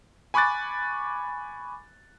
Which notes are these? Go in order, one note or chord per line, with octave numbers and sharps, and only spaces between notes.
G#5 B5 C#6 D6 F#6 A6